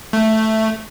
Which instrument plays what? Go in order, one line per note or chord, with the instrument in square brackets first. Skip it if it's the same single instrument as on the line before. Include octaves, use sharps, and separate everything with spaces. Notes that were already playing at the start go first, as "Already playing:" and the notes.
[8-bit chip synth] A3